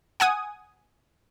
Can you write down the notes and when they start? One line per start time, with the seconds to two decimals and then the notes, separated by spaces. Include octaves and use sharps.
0.20 F#5 G#5 D#6